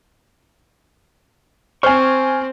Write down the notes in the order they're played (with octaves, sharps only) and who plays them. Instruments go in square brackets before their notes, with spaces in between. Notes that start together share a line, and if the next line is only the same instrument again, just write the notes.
[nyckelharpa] C4 [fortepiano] C5 [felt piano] G#5 F6 [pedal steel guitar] C#6